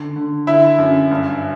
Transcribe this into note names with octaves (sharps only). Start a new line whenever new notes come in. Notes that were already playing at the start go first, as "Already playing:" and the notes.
Already playing: D3
D3
D3 E4 E5
F#2
G2